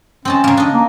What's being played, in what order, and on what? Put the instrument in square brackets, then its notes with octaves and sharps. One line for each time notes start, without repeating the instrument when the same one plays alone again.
[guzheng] C4 D#5 A5 [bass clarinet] C#4
[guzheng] C#3 A#3
D4 D#5
[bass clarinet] A#3